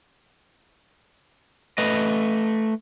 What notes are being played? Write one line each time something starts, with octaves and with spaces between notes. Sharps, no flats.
A3 B4 D#5